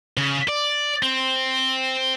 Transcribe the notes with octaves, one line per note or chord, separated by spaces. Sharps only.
C#3
D5
C4